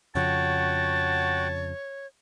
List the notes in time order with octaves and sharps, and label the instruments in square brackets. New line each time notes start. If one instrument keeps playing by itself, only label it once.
[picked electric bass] F2 C#3 F3 [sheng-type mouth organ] F#4 F#5 G5 [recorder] C#5 [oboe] A5